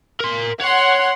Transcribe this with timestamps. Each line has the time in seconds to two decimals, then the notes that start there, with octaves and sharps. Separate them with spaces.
0.20 A#4 C6
0.61 C#5 F#5 C6